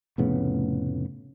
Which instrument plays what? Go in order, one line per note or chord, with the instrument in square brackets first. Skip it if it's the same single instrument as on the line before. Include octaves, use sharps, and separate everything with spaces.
[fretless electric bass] F1 A2 C#3 B3